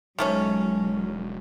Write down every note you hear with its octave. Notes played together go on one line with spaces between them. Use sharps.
E1 D#3 F#3 G#3 A3 C#4